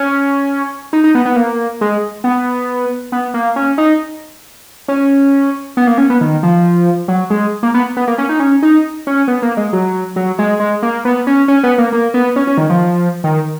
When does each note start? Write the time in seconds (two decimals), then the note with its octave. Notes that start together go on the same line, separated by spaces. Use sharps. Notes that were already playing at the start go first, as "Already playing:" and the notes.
Already playing: C#4
0.93 D#4
1.04 D#4
1.15 B3
1.25 B3
1.36 A#3
1.81 G#3
2.24 B3
3.12 B3
3.34 A#3
3.56 C#4
3.78 D#4
4.88 C#4
5.77 B3
5.87 A#3
5.98 C#4
6.10 B3
6.21 D#3
6.43 F3
7.08 F#3
7.30 G#3
7.63 A#3
7.74 B3
7.97 B3
8.07 A#3
8.18 C#4
8.29 D#4
8.40 C#4
8.63 D#4
9.07 C#4
9.28 B3
9.42 A#3
9.57 G#3
9.73 F#3
10.16 F#3
10.39 G#3
10.60 G#3
10.83 A#3
11.05 B3
11.27 C#4
11.48 C#4
11.63 B3
11.78 A#3
11.92 A#3
12.14 B3
12.36 C#4
12.47 C#4
12.58 D#3
12.70 F3
13.24 D#3